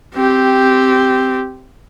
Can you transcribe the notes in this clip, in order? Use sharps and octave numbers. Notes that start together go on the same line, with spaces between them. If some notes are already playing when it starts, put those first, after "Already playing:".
C4 G4